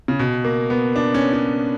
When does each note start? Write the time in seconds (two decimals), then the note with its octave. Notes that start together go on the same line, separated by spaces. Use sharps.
0.08 C#3
0.19 B2
0.44 A#3
0.70 B3
0.96 D4
1.14 C#4
1.33 C#4